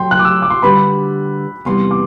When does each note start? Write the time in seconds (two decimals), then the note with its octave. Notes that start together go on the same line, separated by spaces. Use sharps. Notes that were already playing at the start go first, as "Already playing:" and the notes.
Already playing: F#2 F#3 A3 G5 C6
0.11 F#6
0.19 D6
0.25 E6
0.42 D6
0.50 C6
0.63 D3 G3 D4 G4 B4 B5
1.65 E2 C3 E3 G3 C6
1.91 D6